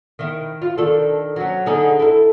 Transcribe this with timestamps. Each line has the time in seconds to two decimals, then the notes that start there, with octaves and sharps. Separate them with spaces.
0.19 D#3 E4
0.62 F4
0.78 D#3 D4 A4
1.36 F#3 C#4
1.66 D3 D#4 G#4
2.00 E4 A4